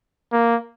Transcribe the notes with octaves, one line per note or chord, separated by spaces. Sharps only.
A#3